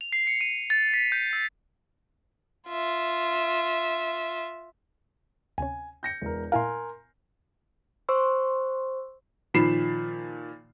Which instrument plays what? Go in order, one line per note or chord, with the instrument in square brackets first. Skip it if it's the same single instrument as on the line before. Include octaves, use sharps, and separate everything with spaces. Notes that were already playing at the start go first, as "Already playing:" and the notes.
[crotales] F7
C7
C#7
D#7
A6
B6
G6
E6
[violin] F4 E5
[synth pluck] D2 C3 C#4 [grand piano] G#5
[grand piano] G6 A#6 C#7
E1 A#4
[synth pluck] A#2 E4 F5 [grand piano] A#4 G#5 C6
[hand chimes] C5 C6 C#6 E6
[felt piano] A#2 D#3 F3 B5 C7 E7